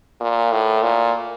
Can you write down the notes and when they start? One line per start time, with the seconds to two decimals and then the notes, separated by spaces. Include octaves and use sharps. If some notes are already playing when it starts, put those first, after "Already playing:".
0.21 A#2
0.52 A2
0.83 A#2